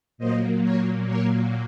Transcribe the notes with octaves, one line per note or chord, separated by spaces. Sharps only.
A#2 F#3 A#3 C5 D#5
A#4 C#5
A#4 C#5